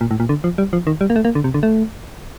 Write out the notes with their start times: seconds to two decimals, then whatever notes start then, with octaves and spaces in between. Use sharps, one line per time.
0.01 A#2
0.11 A2
0.20 A#2
0.29 D3
0.44 F3
0.58 G3
0.73 F3
0.87 D#3
1.01 G3
1.10 A#3
1.16 A3
1.25 A#3
1.35 D3
1.44 C3
1.54 D3
1.63 A3